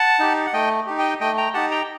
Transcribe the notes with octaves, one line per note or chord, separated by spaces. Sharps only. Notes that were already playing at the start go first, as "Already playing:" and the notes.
Already playing: F#5 A5
D#4 G4
F#5
A3 D#5 G5
D#4 G4
D#5 G5
A3 D#5 G5
G5 A#5
D#4 G4 F#5 A5
G5 A#5